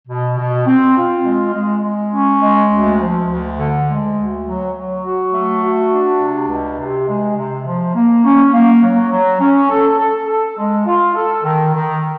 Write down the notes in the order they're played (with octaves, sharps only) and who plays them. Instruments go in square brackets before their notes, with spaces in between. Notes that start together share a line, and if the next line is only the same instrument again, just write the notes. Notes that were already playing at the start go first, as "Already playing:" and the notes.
[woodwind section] B2
B2
C4
F4
G#3
G#3
G#3
C#4
G#3
D2
F3
D2
D3
G#3
D2
F#3
F#3
F#4
A3
F#4
D4
C3
C#2
C3
G#3
C3
F3
A#3
C#4
A#3
F#3
F#3
C#4
A4
A4
A4
G#3
F4
A4
D#3
D#3